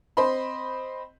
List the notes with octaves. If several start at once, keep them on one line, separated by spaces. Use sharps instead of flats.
C4 C5 D#5 B5 C6